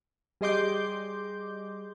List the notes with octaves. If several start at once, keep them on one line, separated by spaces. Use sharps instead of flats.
G3 G#4 D#5 C6 D6 G6